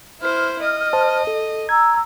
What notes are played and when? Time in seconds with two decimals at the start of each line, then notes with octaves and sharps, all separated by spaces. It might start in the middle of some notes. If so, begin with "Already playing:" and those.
0.21 E4 C5 F6
0.62 D#5
0.93 C5 A5
1.27 A4
1.69 A#5 E6 G#6